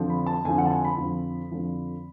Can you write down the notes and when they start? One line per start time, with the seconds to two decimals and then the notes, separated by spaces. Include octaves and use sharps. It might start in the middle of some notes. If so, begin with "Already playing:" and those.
Already playing: F2 D3 F3
0.10 B5
0.26 A5
0.45 F2 D3 F3 G#5
0.58 F#5
0.66 A5
0.71 G#5
0.85 B5
0.97 F2 D3 F3
1.51 F2 D3 F3